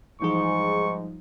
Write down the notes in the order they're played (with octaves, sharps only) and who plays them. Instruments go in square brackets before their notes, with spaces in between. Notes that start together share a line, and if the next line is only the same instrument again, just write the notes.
[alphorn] G#2 [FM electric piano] E3 G#4 [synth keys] F3 G3 D#4 [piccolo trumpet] C#6